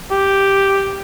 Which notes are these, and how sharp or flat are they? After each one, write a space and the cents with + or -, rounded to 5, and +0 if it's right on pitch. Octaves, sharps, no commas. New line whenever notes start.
G4 +0